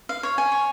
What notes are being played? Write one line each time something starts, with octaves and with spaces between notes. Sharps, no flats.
F5
C#5
G#5
C#6